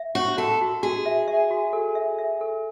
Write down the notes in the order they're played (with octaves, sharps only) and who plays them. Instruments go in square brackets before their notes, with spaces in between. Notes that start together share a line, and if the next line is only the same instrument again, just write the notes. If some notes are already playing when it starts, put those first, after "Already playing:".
Already playing: [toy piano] E5
[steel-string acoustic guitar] F#4 [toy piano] C#5
[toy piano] F#4 [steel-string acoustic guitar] A4
[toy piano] F#4
[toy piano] F#4 [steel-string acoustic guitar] G#4
[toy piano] E5
E5
F#4
A4
E5
E5
A4